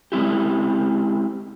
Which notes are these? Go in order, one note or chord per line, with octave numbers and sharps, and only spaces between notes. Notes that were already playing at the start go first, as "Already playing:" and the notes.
G#3 C4 E4 G4